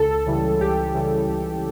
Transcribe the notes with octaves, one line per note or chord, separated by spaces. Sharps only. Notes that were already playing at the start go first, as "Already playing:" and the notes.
Already playing: C#2 A4
C#3 E3 G3
C#2 G4
C#3 E3 G3
C#2